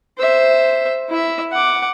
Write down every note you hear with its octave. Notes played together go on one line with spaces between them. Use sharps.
C5 E5
E4 E5
F#5 D6